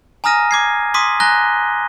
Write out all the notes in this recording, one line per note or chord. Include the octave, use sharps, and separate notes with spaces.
G#5 A#5 D#6 F6 A#6 D#7
D6 G#6 C7
C6 D6 D#6 B6 D#7
G#5 A#5 F#6 A#6 G7